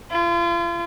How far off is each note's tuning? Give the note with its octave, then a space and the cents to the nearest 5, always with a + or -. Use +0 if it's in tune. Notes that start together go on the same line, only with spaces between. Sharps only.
F4 -35